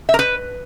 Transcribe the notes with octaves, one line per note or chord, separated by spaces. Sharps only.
E5
A#4
B4